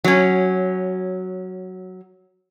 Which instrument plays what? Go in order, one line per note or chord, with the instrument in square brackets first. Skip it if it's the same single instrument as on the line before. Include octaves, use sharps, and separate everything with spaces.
[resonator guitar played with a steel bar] F#3 C#4